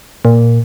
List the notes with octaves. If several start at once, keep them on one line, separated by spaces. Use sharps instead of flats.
A#2